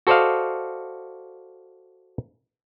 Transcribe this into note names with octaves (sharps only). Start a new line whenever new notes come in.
F#4 A4 C5 D5 D#5 F5